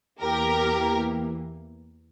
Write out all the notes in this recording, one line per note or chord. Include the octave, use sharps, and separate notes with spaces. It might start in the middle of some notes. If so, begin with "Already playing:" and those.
E2 E3 A#3 G4 A#4